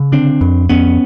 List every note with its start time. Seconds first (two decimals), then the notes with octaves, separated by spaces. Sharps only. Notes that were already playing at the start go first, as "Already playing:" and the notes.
Already playing: C#3
0.12 D3 C4 D4
0.41 F2
0.69 F2 B3 C#4